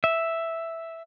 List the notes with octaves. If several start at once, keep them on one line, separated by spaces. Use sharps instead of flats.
E5